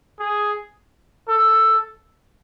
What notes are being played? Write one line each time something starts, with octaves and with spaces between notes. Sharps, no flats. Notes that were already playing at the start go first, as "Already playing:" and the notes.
G#4
A4